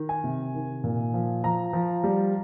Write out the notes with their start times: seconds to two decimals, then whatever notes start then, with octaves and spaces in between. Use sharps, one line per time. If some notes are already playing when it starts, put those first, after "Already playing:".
Already playing: D#3
0.09 G#5
0.24 C3
0.54 D#3
0.84 A#2
1.14 F3
1.44 F3 A#5
1.73 F3
2.04 G3